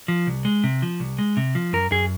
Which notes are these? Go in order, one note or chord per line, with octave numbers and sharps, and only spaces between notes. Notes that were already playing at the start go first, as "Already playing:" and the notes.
F3
C2
G#3
C3
F3
C2
G#3
C3
F3
F#2 A#4
F#2 G#4